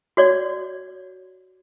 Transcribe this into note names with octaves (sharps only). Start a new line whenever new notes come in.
F#4 C#5 D5